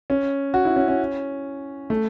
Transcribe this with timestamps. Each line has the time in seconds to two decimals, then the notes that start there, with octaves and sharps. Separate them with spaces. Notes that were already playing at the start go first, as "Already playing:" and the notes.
0.10 C#4
0.54 F#4
0.65 E4
0.76 C#4
0.88 C#4
1.90 A3